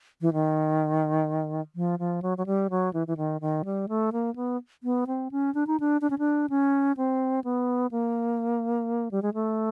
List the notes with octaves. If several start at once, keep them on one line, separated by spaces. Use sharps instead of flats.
E3
D#3
F3
F3
F#3
F#3
G3
F#3
E3
E3
D#3
D#3
G3
A3
A#3
B3
B3
C4
C#4
D4
D#4
D4
D4
C#4
D4
C#4
C4
B3
A#3
G3
G#3
A3